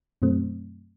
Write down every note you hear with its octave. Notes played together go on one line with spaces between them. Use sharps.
F#2 B2 F#3 A3 C4